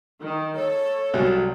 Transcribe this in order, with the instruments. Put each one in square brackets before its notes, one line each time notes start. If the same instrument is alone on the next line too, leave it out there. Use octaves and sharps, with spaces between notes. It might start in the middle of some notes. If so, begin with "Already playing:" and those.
[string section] D#3
[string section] A4 [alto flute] C#5
[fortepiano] C2 F#3